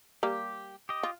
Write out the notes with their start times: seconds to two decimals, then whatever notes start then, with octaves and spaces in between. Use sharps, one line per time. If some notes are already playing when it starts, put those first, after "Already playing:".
0.23 G3 A#3 G4
0.89 G4 D#5
1.03 F4